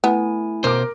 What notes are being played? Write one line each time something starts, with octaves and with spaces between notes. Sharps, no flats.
A3 B3 E4 G#5
B2 A#4 C5 D6